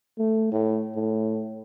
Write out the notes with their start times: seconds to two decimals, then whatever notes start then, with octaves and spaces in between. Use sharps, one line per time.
0.19 A3
0.52 A2
0.95 A2